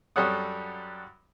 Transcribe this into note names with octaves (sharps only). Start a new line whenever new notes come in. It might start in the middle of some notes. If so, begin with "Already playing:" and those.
F#2 G3 A4 C#5 F#5 D#6